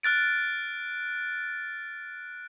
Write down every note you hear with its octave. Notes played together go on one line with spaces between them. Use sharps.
F6 F#6 A6 D7